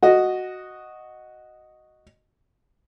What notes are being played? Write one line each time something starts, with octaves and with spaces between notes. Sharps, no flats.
F#4 D#5